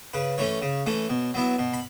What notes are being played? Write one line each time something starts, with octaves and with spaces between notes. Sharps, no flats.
C#3 B4
E3 A3 C#4 C#5
C#3
E3 A3 C#4
B2
F#3 B3 E4
B2
B5